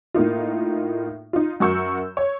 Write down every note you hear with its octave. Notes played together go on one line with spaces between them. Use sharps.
A2 A#3 D#4 F4
D#4 F4
F#2 F#4 A#4 C#6 E6 G6
C#5